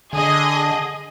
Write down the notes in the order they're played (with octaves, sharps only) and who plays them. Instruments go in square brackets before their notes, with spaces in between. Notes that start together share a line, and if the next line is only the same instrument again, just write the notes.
[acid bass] D3 [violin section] G#4 D#5